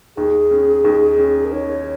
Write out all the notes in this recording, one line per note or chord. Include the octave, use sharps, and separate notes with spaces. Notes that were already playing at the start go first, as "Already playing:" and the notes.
D#2 G#4
C#4
D#2
C#4
A#4
D#3 C#5